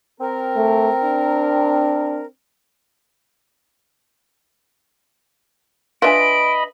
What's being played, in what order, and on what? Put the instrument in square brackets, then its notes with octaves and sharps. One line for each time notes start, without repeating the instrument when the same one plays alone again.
[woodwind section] C4 A#4
[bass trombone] A3
D4
[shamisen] D4 F4 [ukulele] B4 E5 G#5 [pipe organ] D#5 B5 [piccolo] D7